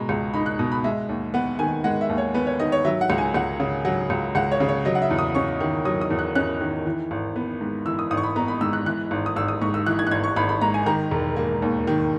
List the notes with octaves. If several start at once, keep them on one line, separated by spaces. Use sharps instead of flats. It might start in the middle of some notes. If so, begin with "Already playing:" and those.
Already playing: B2 G#3 A#5 B5
C#2
D#4 B5
F#6
B2 D#6
B5
G#3 E5
D#2
B3 F#5
D#3 G#5
G#3 F#5
E5
D#2
C#5
B3 B4
C#5
D#3 D#5
C#5
F#3 E5
F#5
C#2
G#5
C#2 F#5
C#3
F#3 F#5
C#2
C#2 F#5
C#5
C#3
C#5
F#3 D#5
F#5
E5
E2
D#6
C#4 C#6
D#3
F#3 D#6
D#6
E2
F#6
C#4 F#6
D#3
E3
G#1
B3
G#2
E3 E6
D#6
G#1 D#6
C#6
B5
B3 A#5
B5
G#2 E6
F#6
E3 F#6
G#1
D#6
G#1 E6
D#6
G#2 C#6
E6
E3 F#6
G#6
F#6
G#1 G#6
C#6
G#1 B5
B5
G#2 A#5
G#5
D#3 A#5
E1
A#3
D#2
D#3